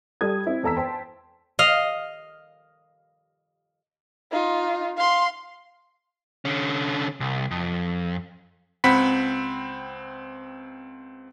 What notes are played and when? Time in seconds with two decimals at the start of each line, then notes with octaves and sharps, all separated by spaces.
0.21 G3 A4 D#6 G#6
0.46 C4 E4
0.63 E2 A4 A#5 E6 B6
0.77 C5 G5 A5 C6
1.59 D#5 F5
4.32 D#4 F4
4.97 F5 C6
6.45 D3 C#4
7.20 C2
7.51 F2
8.84 C#2 C4 F#5 B5 B6